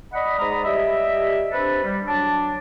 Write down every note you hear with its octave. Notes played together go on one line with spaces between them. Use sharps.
D5 D#5 F#5 B5
G#2 G#3 D5 A#5 B5 D#6
G3 G4 D#5 E5
C4 D4 G4 A4 B4 B5
G3
F#3 D4 A5